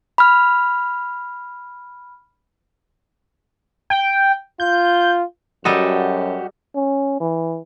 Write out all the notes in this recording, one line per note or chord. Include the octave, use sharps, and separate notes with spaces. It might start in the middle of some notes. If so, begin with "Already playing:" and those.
B5 F6
G5
F4 G6
F#2 G3 F#4 G4 A4 D#5
C#4
E3